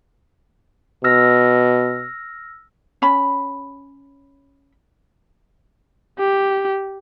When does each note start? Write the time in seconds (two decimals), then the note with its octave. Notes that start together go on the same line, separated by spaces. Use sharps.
1.04 B2 E6 F6 A#6
3.02 C#4 B5
6.19 G4